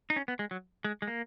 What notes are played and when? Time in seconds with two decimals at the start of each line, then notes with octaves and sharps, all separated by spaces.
0.10 D#4
0.16 C#4
0.28 B3
0.39 G#3
0.51 F#3
0.84 G#3
1.02 G#3
1.08 A#3